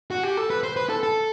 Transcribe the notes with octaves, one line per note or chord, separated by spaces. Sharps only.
F#4
G4
A4
B4
C5
B4
A4
A4